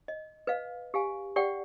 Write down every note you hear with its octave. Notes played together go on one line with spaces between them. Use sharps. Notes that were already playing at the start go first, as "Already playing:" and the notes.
D#5
B4 D#5 F5
G4 F5 G#5
G4 D5 F#5 G5